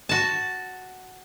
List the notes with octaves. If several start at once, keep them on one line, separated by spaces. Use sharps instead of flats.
F#4 A5